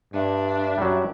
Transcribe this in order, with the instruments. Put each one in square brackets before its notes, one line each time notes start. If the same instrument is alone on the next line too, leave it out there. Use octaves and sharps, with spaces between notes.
[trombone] G2 [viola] D4 [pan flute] E5
[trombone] F#2 [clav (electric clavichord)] F#3 G3